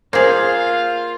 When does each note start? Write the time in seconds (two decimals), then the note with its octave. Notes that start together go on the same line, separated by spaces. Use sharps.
0.13 A#3 F4 G#4 C5 F5